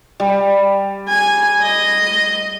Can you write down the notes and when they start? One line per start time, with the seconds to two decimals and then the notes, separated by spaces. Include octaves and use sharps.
0.20 G3
1.09 G#5
1.63 D#5